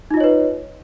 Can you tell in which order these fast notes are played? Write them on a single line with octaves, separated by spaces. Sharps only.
D#4 F4 D#5 C#5 B4